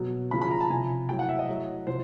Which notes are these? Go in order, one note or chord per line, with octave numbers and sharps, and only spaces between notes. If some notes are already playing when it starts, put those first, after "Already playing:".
Already playing: B2 F#3
C#3 F3 B5
B5
A#5
A5
C3 F3 G#5
A2 F#3 G5
F#5
E5
D#5
A2 F#3
C3 F3 C5